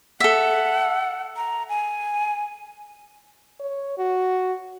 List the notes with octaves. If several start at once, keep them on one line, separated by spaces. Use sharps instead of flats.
A4 E5 F#5
A#5
G#5
C#5
F#4